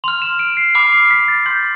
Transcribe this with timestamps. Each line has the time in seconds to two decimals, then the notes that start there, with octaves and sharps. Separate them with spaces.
0.04 C6 F6 F7
0.22 E7
0.39 D7
0.57 C7
0.75 B5 D6 F6 C7
0.93 C7
1.11 B6
1.28 A6
1.46 C6 G6